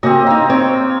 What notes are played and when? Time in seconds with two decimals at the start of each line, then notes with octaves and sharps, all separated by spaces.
0.03 C#3 A#3 C4 F#4 G4 D#5
0.27 A#3 D#4 E4 F5
0.50 C4 C#5